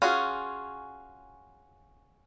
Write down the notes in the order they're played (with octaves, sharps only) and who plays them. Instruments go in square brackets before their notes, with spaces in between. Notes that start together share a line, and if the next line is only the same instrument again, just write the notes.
[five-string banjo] C#4 F4 F#4 G#4